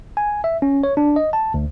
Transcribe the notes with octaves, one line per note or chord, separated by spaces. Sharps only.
G#5
E5
C#4
C#5
D4
D#5
A5
D2